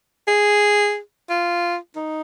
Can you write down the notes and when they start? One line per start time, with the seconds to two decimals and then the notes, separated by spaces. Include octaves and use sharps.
0.27 G#4
1.29 F4
1.96 D#4